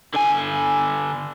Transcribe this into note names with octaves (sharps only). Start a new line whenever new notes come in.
D3 G#5